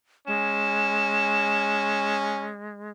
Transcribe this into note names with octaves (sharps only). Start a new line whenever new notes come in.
G#3 C#4 E7